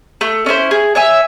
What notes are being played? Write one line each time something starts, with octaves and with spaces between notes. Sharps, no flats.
A3
C#4 E4 C5
G#4
C#5 E5 G#5